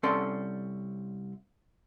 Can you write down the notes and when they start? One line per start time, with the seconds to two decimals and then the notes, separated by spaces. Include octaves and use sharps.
0.03 C2 C4 C#4 A4 D5 C6